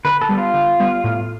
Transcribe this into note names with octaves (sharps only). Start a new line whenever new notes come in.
D3 B4
A4
G3 B3
F4
D3
G3 B3
A2